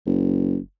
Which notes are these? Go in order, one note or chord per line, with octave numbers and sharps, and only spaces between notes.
F#1